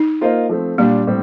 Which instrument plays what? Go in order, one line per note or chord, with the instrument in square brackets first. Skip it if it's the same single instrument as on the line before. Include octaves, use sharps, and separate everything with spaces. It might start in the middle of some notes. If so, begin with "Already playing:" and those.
Already playing: [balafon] D#4
[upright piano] A#3 F4 C5 D#5
F3 A3 C4
[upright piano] A#2 G3 D4 G4 [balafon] A#3
[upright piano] A2 G3 C4